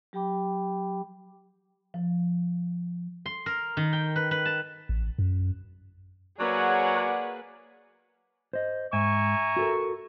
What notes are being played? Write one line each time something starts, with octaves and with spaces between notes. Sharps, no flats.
F#3 G4 G5 B5 D6
F3
C6
A#4
D#3
G5
B4
B4
A5
A1
F#2
F#3 A#3 G#4 B4 C#5 D5 F#5
C5 D#5
G#2 E5 G#5 A#5 C#6
F#4 A4 A#4